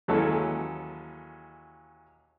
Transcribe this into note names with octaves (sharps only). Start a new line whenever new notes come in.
D#2 E3 F#3 G#3 C#4 A4